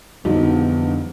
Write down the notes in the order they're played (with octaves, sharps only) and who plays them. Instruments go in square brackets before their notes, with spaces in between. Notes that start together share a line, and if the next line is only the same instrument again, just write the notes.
[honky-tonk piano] A#1 D#4 [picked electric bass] F2 G3 [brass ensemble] D3 E3 B3 [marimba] F#4